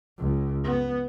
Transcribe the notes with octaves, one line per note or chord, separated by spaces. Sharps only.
C#2
B3